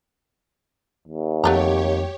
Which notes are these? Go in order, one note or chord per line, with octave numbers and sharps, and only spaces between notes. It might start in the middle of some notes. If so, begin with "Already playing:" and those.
D#2
F2 F#3 A3 G4 C#5 A#5